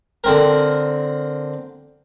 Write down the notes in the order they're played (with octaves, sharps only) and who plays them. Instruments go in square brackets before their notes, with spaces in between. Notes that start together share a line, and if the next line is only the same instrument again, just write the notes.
[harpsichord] D3 C4 A#4